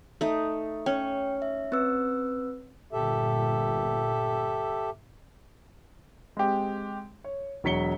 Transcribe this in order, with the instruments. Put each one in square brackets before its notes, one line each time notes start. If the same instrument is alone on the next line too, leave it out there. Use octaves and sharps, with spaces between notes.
[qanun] A3 D#4
[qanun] C#4 [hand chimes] G5
[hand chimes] E5
C4 B4 E6
[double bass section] G1 A#2 [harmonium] G4 A4 E5
[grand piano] G#3 C4 G4
C#5
E1 F#3 C#5 B6 C#7 G7